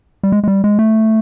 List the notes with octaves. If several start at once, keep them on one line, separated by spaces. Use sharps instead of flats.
G3
G#3
G#3
G3
G#3
A3